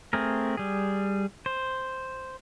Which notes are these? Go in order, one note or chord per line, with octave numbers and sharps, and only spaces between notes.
A3 C4 G#4 A#4
G3 G#4
C5